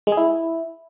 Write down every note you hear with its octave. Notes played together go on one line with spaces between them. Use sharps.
G#3
G#4
E4